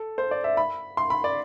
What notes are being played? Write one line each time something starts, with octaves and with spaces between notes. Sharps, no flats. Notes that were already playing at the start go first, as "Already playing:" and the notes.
Already playing: A4
C5
D5
E5
B5
C6
B5
D5